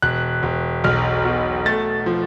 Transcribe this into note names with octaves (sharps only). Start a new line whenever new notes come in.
E1 F#6
E1
B1 F6
B2
A3 A6
F3